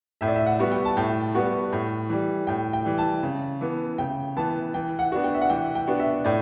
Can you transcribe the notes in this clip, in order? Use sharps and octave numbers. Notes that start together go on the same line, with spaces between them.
A2 E5
D5
E5
F#5
G3 B3 F#4
G5
A5
A2 G5
G3 B3 F#4
A2
E3 G3
A2 G5
G5
E3 G3
A5
C#3
E3 B3
C#3 G5
E3 B3 A5
E3 G5
F#5
B3 D4 F#4
G5
E5
F#5
E3 G5
G5
B3 D4 F#4
E5
A2 D5